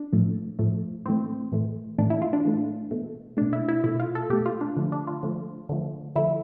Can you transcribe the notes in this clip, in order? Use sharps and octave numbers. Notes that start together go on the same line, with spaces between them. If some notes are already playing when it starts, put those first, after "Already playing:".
Already playing: D4
A2 F3 A3
A2 F3 A3
A2 E3 A3 C4
A2 E3 A3
A2 E3 A3 D4
E4
F4
D4
A2 E3 A3
B2 A3
B2 A3 D4
E4
E4
B2 A3 E4
F4
A4
B2 A3 G4
F4
D4
D3 F3 A3
D4
F4
D3 F3 A3
D3 F3 A3
D3 F3 A3 E4